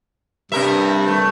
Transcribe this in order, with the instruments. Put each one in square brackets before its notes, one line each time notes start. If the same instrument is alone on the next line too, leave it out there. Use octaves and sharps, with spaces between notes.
[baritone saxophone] G2 [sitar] C3 A#4 E5
[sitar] A3